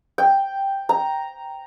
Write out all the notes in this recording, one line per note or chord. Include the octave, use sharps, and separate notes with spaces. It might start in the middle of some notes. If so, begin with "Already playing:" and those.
G5
A#5